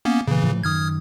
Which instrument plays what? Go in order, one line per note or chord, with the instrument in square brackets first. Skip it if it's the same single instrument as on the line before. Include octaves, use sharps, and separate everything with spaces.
[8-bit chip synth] A#3 B3 C#4
[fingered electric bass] A#2 [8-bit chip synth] C#3 E3
[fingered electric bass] A2 F3 A3
[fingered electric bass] F#2 D#3 [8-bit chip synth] D#6 F6 G#6